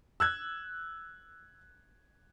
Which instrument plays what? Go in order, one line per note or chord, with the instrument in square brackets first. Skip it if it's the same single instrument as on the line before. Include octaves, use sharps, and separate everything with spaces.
[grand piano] E6 F#6 G#6